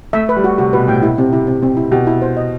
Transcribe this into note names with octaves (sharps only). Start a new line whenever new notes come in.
A3 E5
B4
G3
F#4
C3 F#4
B2 B4
A2 G5
B2 E4
C3 C4
C3 E4
C4
C4
E4
B2 G4
E4
C5
D#5